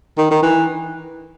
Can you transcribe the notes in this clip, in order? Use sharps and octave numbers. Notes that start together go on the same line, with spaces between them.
D#3
D#3
E3